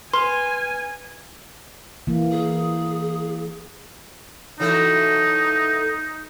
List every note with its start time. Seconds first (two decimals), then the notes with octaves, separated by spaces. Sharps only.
0.14 B4 G#5 C6
2.07 E3 A#3
2.31 G#4
4.60 E3 F#3 A3 D#4